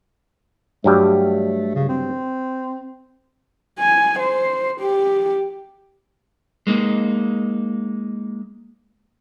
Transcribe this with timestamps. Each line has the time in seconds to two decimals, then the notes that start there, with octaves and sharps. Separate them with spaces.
0.84 G2 F#3 G3 A3
1.75 C#3
1.89 C4
3.79 G#5
4.19 C5
4.80 G4
6.67 G#3 A#3 D#4